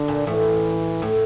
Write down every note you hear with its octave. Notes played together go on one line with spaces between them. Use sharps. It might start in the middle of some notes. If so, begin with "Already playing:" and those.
Already playing: D3
A#2
A2 E3
A2